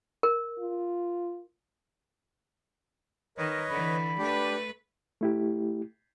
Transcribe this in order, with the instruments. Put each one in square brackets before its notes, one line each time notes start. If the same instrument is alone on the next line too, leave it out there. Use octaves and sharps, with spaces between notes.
[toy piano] A#4
[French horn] F4
[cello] D#3 [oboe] A#4 [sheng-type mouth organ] B4 C#5 D#5
[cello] D3 E3 [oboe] B5
[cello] A3 B4 [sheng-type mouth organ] D4 G4
[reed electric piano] A3 E4 G4